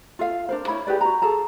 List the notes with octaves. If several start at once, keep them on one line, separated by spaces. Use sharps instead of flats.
F4 A4 F5
D4 A#4 C5
E4 C#5 B5
G4 G#4 B4 D5
F#4 A#5
G#4 A4 A5 A#5